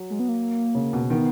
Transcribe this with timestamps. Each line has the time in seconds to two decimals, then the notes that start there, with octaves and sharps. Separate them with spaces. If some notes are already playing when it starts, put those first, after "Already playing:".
Already playing: F#3
0.10 G#3
0.20 B3
0.29 A#3
0.75 C#3
0.93 B2
1.10 D#3 B3